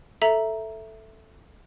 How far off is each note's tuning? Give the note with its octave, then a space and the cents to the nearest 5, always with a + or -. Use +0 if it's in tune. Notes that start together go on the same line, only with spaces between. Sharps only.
A4 +0 E5 +0 A#5 +0